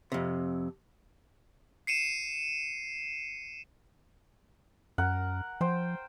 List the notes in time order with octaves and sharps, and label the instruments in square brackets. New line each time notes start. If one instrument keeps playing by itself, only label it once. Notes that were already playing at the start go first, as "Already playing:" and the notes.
[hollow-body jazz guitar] F2 C3
[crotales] C7 C#7 D#7 E7
[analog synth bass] F#2 [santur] A#4 F#5
[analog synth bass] F3 [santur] C5 G5